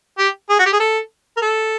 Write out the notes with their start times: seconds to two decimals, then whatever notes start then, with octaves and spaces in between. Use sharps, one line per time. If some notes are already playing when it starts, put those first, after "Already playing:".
0.18 G4
0.49 G#4
0.59 F#4
0.66 G4
0.73 G#4
0.80 A4
1.37 A#4
1.42 A4